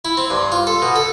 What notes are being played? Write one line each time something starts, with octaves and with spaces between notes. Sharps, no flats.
E4
C4
G2
F4
A4
B2
A4